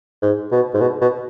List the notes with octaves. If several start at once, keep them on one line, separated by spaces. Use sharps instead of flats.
G#2
B2
G#2
B2
B2